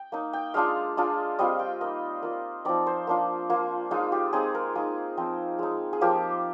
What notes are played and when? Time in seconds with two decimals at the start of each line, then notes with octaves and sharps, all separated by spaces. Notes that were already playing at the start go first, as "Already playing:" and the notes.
Already playing: G5
0.12 A#3 D#4
0.33 G5
0.54 G#3 D4 F4 F5
0.97 G#3 D4 F4
1.39 G3 C4 F4 D#5
1.59 G5
1.81 A#3 D#4 D#5
2.23 A#3 F4
2.65 F3 C4 D#4 D5
2.87 C5
3.07 A#3 D4 F4
3.50 A#3 F4
3.91 G#3 D#4 F4
4.12 G4
4.33 G#3 C4 D#4 G#4
4.55 A#4
4.75 A#3 D#4 G#4
5.17 F3 C4 D#4
5.59 G#3 D#4
5.93 G#4
6.01 F3 A#3 F4 G4